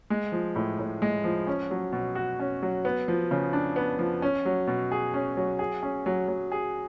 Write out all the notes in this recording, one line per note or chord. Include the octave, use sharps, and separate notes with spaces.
G#3
F3
A2
A2
G#3
F3
C#4
F#3
B2
F#4
C#4
F#3
B3
F3
C#3
D4
B3
F3
C#4
F#3
B2
G#4
C#4
F#3
G#4
C#4
F#3
F#3
G#4